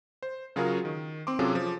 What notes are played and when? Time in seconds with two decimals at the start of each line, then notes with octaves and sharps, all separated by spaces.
0.23 C5
0.56 C#3 F#3 F4 F#4 G#4 A#4
0.85 D#3
1.27 C4 C6 D6
1.39 C3 F#3 C#4 F4 G#4 A4
1.55 F3